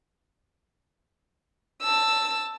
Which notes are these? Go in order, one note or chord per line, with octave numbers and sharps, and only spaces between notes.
A5 E6